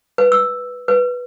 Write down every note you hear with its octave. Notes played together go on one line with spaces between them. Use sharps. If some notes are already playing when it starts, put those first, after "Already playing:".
B4
E6
B4